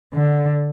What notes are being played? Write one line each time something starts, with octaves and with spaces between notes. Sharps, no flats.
D3